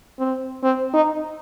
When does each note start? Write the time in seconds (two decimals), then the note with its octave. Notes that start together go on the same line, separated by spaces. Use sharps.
0.19 C4
0.64 C4
0.94 D#4